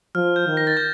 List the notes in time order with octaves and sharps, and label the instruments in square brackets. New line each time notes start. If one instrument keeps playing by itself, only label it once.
[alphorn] F3 [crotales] F6
[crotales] G6
[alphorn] D#3
[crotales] A#6
A6
G6